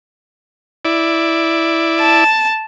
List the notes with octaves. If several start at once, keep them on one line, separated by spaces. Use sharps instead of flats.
E4 D5
A5